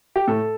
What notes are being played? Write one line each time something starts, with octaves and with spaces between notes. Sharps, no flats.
G4
A2 A4